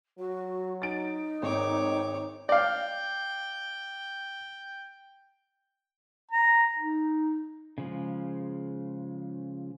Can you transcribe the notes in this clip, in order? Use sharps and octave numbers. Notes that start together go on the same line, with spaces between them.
F#3 F#4
D#4 A6 D7
G#1 D#3 C#5 D6
D5 F5 G5
A#5
D#4
C#3 F3 G#3